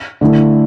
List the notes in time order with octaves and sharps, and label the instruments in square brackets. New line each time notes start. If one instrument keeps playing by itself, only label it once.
[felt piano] D3 A3 E4